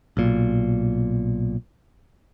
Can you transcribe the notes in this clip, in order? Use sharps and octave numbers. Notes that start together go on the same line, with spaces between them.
B1 A#2